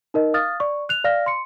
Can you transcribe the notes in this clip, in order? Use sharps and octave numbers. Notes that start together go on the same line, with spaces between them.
D#4 A#4 D#5
F5 D#6 F6 A6
D5 C#6
F#6 F7
D5 F5 F6 A#6
C6 C#7